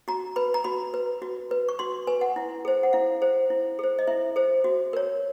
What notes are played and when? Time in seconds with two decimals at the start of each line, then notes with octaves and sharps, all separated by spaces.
0.08 F#4 A#5
0.36 B4 B5
0.54 A#5
0.64 F#4 B5
0.94 B4
1.22 F#4
1.51 B4
1.69 C#6
1.79 F#4 C6
2.07 B4 G#5
2.21 F#5
2.36 E4
2.65 G#4 C5
2.83 F#5
2.93 E4 F5
3.21 G#4 C5
3.50 E4
3.79 G#4 C5
3.99 D#5
4.07 E4 E5
4.36 G#4 C5
4.64 F#4
4.93 A#4 C#5